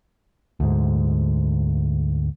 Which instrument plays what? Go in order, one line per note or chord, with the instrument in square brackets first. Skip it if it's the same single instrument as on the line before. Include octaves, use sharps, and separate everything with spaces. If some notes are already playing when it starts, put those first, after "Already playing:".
[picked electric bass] D2 G#2